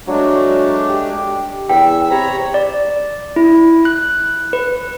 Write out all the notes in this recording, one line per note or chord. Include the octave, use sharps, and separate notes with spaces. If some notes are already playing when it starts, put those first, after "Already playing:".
F#3 G#3 A3 D4
G4
E2 E5 G5 E6
C3 C#5 A#5 B5
D5
E4
F#6
B4